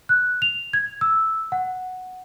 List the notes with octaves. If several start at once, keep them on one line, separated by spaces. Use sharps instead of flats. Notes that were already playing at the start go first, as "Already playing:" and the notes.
F#6
F7
G#6
E6
F#5